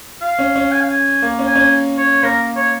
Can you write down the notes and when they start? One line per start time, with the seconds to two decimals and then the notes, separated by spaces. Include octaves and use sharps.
0.22 F5
0.39 C#4
0.56 C#4
0.72 G#5
0.81 F5
0.90 G#5
1.22 A#3
1.39 C#4
1.47 G#5
1.56 C#4
1.98 C#5
2.23 A#3 A#4
2.56 C#5